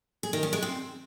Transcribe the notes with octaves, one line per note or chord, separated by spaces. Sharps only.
G#4
D#3
C#4
G#3
C4